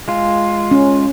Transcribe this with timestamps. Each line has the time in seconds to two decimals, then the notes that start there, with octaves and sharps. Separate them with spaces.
0.08 G#3 F4
0.71 C#4